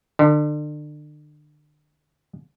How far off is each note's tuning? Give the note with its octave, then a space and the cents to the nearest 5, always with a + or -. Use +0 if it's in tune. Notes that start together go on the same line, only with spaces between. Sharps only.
D3 +35